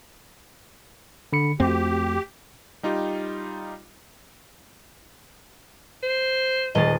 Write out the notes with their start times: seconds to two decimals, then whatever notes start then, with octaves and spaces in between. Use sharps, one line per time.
1.33 D3 B5 C#7
1.60 F2 A3 C4 F#4 G4
2.83 G3 D#4 F4 G4
6.03 C5
6.75 D#1 G#3 D#5 A6